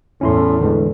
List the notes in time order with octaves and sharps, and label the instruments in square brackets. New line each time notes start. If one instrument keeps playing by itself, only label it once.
[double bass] E2 A2 [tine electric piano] C#4 E4 C6
[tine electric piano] D3 E3 G#3